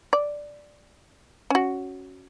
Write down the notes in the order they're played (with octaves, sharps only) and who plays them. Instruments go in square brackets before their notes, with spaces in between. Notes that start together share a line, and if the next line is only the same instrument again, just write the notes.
[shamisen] D5
C#4 F#4